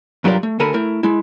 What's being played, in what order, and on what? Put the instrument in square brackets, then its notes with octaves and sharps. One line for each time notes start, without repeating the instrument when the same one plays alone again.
[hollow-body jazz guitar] G2 F#3 F4 G4 A#4 D5
A3
D2 A4 A#4 G#5 B5
A3 E4 A#4
G#3 E4